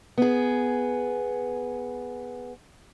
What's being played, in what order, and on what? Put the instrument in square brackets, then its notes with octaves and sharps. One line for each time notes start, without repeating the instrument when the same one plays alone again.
[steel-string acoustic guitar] B3 G#4